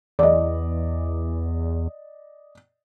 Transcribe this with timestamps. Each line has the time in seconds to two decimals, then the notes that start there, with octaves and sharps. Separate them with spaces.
0.19 E2 D5 D#5